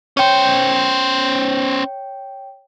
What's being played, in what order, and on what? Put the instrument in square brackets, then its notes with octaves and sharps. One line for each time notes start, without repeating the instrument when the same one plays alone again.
[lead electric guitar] C#4 C5 [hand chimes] C#5 G5